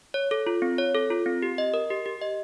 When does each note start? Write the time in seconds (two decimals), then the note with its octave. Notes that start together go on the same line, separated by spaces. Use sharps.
0.14 C#5
0.31 A4
0.47 F4
0.62 C4
0.78 C#5
0.95 A4
1.10 F4
1.26 C4
1.42 G4
1.58 D#5
1.74 A#4
1.90 G4
2.06 G4
2.21 D#5